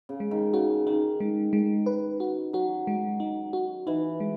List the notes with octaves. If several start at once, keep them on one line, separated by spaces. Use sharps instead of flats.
C#3
G#3
D#3
C#3 F#4
D#3 D#4
G#3
G#3
B4
F#4
F#3 F#4
G#3
D#4
F#4
E3 D#4
G#3